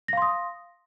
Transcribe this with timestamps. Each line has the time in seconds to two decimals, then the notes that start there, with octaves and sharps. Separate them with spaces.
0.08 A#6
0.13 F5
0.17 C6
0.22 D#6